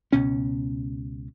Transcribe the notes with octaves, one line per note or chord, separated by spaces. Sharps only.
C#2 B2 C#4